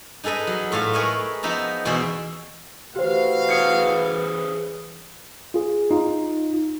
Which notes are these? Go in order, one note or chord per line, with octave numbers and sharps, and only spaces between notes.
D#4 G#4 A4 B4 D#5
F#3
A2 F4 A4 D#5 F5 A5
G#4 A#4 B4 C#5 D#5 E5
F3 B3 D#4 E5 A#5
E2 B2 G#4 D5 E5 C6
E3 A3 F#4 G4 C5 F5
G#4 C5 C#5 C#7
F4 G#4
D#4 F4